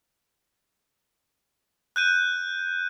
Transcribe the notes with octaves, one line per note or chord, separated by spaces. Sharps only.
F#6 G6 D#7